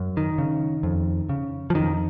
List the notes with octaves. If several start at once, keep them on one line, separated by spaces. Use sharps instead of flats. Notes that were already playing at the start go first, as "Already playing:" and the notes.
Already playing: F#2
D#3
C#3
F2
C#3
F3
F2 D#3